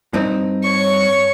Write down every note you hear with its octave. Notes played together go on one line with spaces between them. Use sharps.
G2 C4 D#4
C#5 C#6